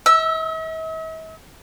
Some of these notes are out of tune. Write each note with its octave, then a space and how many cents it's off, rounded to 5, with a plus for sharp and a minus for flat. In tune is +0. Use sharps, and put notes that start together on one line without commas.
E5 -45 E6 +0